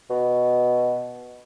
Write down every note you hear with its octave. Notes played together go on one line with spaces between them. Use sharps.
B2